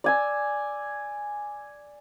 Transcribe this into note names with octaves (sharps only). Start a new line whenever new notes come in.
D5 G#5 E6